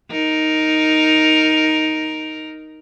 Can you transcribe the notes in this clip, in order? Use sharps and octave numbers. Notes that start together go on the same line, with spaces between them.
D#4 A#4